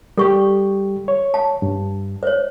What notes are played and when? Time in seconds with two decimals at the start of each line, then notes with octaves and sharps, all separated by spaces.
0.18 G3 G4 A4 C#6
1.08 C#5
1.34 A5
1.62 G2
2.23 C5 C#5